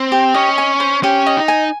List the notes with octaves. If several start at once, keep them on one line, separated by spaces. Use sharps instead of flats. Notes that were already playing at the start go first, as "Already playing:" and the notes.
Already playing: C4 C5
G4
C#4 D#5
G#5
C5
C#4 G4
D#5
D#4
G#5